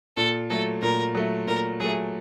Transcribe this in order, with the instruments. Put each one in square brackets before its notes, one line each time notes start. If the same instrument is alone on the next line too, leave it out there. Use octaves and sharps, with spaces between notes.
[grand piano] A#2 [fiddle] A4
[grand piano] F#3 A3 [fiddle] A4
[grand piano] A#2 [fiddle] A#4
[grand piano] F#3 A3
[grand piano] A#2 [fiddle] A#4
[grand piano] F#3 A3 [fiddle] G#4